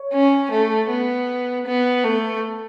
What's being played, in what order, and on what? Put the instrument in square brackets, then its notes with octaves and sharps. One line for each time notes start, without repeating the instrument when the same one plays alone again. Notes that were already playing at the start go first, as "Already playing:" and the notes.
Already playing: [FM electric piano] C#5
[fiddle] C#4
A3
B3
B3
A3